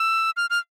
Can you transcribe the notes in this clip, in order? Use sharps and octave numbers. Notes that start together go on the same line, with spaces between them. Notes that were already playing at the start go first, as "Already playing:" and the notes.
Already playing: E6
F6
F6